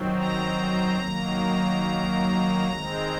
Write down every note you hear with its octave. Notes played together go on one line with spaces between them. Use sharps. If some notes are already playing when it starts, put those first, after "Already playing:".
Already playing: D#3 F#3 C4
A#5
D#3 F#3 A#3
D#3 G#3 C4